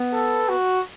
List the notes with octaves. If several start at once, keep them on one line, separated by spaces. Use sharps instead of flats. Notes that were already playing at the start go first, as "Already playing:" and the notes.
Already playing: B3
A4
F#4